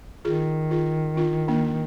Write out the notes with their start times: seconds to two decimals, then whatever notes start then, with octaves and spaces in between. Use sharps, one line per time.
0.25 D#3 F4 G#4
0.71 F4 G#4
1.17 D4 F4
1.48 A#3 D4